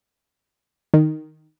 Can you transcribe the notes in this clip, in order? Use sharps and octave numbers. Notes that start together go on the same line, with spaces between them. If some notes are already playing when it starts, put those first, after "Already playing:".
D#3